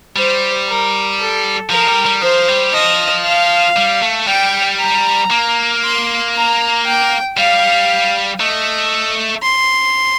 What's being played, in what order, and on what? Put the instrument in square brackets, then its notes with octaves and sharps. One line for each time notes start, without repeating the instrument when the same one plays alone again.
[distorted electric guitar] G3 [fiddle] C5
[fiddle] A#4
A4
[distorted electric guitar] F3 [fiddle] A#4
[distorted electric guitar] G3
G3
[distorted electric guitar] F3 [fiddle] C5
[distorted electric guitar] G3
[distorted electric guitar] F3 [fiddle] D#5
[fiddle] F5
[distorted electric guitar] G3
A3
[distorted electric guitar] G3 [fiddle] G5
[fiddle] A#5
[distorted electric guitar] A#3
[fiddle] C6
A#5
G5
[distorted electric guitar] G3 [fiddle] F5
[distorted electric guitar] A3 [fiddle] D#5
[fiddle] C6